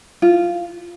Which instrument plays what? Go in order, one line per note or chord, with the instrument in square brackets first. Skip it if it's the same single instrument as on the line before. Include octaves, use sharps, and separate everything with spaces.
[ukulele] F4